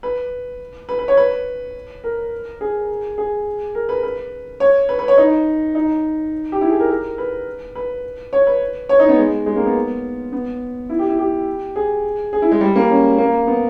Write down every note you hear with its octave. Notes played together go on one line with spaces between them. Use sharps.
B4
B4
B4
C#5
B4
A#4
G#4
G#4
A#4
B4
B4
C#5
B4
B4
C#5
D#4
D#4
G4
E4
G#4
A#4
A#4
B4
B4
C#5
B4
C#5
D#4
B3
G#3
G#3
A#3
B3
B3
E4
G4
E4
G4
G#4
G#4
E4
G#3
G3
A#3
C#4
A#3
B3